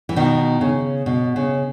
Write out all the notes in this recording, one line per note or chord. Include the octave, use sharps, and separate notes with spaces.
E3
B2 D#3
C#3
B2
C#3